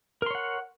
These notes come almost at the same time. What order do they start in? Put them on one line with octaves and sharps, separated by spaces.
A#4 C6 C#5 F#5